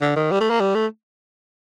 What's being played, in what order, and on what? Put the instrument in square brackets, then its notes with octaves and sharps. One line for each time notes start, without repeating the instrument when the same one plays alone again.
[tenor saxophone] D3
D#3
G3
A3
A#3
G3
A3